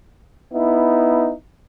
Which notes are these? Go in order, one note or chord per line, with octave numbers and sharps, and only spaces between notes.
B3 D#4 E4